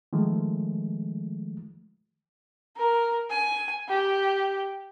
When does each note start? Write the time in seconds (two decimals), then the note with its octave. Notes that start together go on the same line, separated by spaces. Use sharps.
0.13 D#3 F3 G#3 A3
2.77 A#4
3.30 G#5
3.89 G4